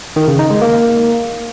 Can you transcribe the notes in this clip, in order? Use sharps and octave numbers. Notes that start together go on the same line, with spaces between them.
D#3
C#3
D#4
G#3
A#3